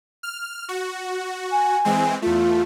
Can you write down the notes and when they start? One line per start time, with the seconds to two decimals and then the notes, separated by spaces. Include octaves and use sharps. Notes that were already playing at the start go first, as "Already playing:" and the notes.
0.23 F6
0.69 F#4
1.52 G#5
1.85 E3 G#3 C4
2.22 E2 A3 F4